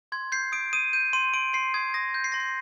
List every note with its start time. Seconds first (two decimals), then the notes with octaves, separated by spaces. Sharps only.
0.12 C6 G#6
0.32 G6 C7
0.52 D#6 D7
0.73 D#6 D#7
0.93 G6 D#7
1.13 C6 D#7
1.34 C6 D7
1.53 C6 C7
1.74 D#6 G#6
1.94 D#6 A#6
2.14 G6
2.24 C7
2.32 C6 A#6
2.40 C7